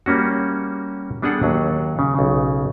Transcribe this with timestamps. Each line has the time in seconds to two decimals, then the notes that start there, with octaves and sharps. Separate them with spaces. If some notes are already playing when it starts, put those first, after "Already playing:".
0.06 G3 A#3 C#4 F#4
1.22 G3 B3 D4 G#4 A4 F#5
1.43 D#2 F#3
1.99 C#3
2.15 B1 C#3